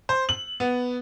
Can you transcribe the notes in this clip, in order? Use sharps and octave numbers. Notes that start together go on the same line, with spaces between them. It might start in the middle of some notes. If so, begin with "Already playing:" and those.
C5
F#7
B3